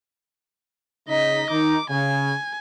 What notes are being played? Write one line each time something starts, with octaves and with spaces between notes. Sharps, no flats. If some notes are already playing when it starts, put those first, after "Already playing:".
C#3 D#4 D#5 B6
D#3 D#4 D6
C#3 G#5